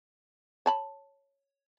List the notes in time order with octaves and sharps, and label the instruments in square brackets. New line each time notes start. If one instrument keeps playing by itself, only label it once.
[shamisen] C#5 A5 B5